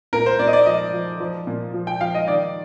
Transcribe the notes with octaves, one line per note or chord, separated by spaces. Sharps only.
A#2 A#4
C5
A#2 D5
D#5
D5
F3 D#5
F3
F3
A#2
F3
G5
F3 F5
D#5
D#3 D5